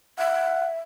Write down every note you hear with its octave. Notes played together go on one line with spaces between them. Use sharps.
E5 F#5